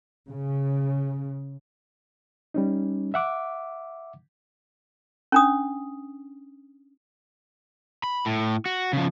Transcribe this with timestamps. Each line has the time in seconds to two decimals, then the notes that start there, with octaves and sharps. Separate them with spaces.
0.28 C#3
2.54 G3 C#4 D#4
3.14 E5 F#5 D6
5.32 C#4 D4 D#6
8.04 B5
8.26 A2
8.66 F#4
8.93 C#3 F3